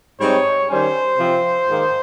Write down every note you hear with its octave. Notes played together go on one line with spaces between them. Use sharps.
G#2 G3 C4 D#4 C#5
D#3 G3 C#4 C5
C3 F3 C4
G#2 D#3 A#3